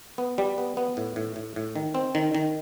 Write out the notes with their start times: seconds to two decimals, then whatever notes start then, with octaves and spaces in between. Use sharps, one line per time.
0.18 B3
0.38 G3
0.58 B3
0.77 B3
0.97 A2
1.16 A2
1.36 A2
1.56 A2
1.76 D#3
1.95 C4
2.15 D#3
2.35 D#3